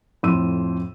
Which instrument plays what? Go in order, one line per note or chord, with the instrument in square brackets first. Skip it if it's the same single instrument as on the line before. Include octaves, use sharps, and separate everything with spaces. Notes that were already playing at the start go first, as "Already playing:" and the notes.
[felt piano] F2 A2 C6 E6 D#7